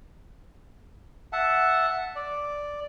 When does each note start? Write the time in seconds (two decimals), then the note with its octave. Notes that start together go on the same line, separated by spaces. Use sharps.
1.33 E5 F#5 A5
2.16 D5